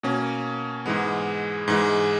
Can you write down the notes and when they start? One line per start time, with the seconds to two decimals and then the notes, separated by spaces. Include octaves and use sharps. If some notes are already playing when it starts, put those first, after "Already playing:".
0.03 B2 A#3 C#4
0.86 G#2 E3 G#3 B3
1.68 G#2 E3 G#3